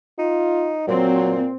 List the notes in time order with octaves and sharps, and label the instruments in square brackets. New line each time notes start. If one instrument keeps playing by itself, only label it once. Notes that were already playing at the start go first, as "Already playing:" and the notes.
[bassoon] D#4 [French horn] F4
[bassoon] A#2 [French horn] F#3 [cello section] C4